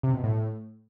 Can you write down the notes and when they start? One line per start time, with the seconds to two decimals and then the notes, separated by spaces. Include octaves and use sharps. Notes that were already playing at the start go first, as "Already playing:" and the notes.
0.03 C3
0.14 B2
0.24 A2